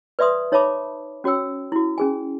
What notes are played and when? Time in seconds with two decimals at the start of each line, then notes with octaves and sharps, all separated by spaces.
0.19 B4 D5 E5 C6 D#6
0.52 D#4 C#5 E5 A5 B5 D6
1.24 C#4 F#4 C#5 G5 E6
1.72 E4 F#4
1.98 C#4 G#4 G#5